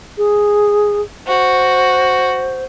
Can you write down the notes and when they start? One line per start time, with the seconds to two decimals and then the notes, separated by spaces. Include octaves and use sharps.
0.18 G#4
1.27 F#4 C5